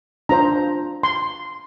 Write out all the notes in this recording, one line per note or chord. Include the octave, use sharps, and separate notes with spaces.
D4 F4 C5 A#5
C6